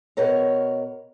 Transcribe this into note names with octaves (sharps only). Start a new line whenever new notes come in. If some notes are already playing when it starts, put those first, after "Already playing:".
B2 A#4 C#5